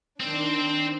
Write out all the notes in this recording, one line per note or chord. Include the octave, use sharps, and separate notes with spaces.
D#3 C4 D4 C5